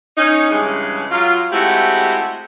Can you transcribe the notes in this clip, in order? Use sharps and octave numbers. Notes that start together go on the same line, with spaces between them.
C#4 D#4
G2 C#3 E3 G#3
F#3 F4
G#3 A3 C4 E4 F#4 G4